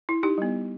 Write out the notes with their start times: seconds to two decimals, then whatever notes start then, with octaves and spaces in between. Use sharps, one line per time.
0.09 E4
0.23 D#4 G4
0.38 G3 B3